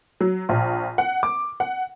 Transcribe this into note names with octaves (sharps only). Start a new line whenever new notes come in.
F#3
A#1
F#5
D6
F#5